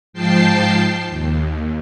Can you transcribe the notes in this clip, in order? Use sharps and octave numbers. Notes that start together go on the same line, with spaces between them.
G#2 F3 G5 A5 C7
D#2